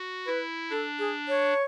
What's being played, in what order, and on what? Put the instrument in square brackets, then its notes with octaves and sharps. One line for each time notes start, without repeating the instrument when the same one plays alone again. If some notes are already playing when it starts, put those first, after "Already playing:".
Already playing: [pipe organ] F#4
[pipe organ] E4 [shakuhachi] B4
[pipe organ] D4 [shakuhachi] A4
[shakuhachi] G#4
C#5